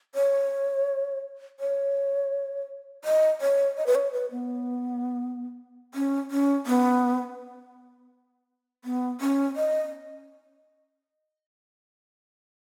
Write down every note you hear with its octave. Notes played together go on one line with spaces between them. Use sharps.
C#5
C#5
D#5
C#5
D#5
B4
C#5
B4
B3
C#4
C#4
B3
B3
C#4
D#5